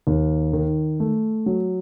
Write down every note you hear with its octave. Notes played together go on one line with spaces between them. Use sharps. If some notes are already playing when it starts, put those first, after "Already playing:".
D#2
D#3
A3
F#3